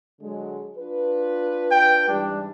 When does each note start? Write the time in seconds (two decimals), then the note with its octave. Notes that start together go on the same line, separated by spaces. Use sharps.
0.21 D3 F#3 G#3
0.77 D4 F4 B4
1.71 G5
2.08 G#2 E3 G3 D4